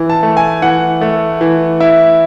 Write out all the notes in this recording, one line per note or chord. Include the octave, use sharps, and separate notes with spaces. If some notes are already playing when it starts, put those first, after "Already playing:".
Already playing: E3
A5
A3
G#5
E3 F#5
A3
E3
E4